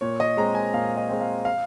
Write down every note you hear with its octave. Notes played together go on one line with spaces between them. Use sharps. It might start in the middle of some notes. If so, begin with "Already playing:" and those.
A#2 C#5
D#5
G#3 C4 A#5
G#5
A#2 F5
D#5
G#3 C4
F5
F5